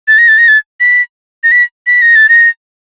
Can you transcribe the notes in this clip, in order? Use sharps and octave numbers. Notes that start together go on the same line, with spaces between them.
A6
A#6
A6
A#6
A6
B6
A#6
B6
B6
A#6
A6
A#6